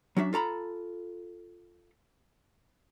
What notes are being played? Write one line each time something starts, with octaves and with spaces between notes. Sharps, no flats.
F#3 C#4 D4 E5
F4 A4 A#5 B5